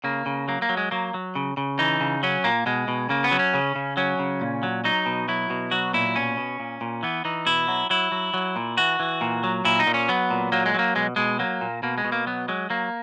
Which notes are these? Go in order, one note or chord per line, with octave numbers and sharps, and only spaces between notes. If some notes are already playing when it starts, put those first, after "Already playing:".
C#3 A#3
C#3
F#3 A#3
A#3
F#3
G#3
F#3 A#3
F#3
C#3
C#3
E3 D#4
C#3
F#3 C#4
A#2 A#3
B2 G#3
B2
C#3 A#3
B3
F#3
C#4
C#3
C#3
F#3 C#4
C#3
A#2
F#3
F#3 D#4
B2
F#3 E4
B2
F#3 F#4
A#2 E4
B2 C#4
B2
A#2
A#2
E3 B3
E3 D#4
B2 E4
F#3
F#3 E4
F#3
F#3
A#2
E3 F#4
E3
A#2
F#3
A#2 E4
D#4
A#2
C#4
F#3 B3
A#2
F#3 A#3
G#3
F#3 A#3
B2 G#3
B2 G#3
F#3 A#3
A#2
B2 A#3
G#3
B2
A#3
F#3 B3
F#3 G#3
F#3 A#3